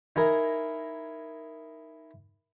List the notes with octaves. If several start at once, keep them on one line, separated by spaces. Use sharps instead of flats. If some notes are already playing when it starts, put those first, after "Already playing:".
D#4 E4 G#4 A#4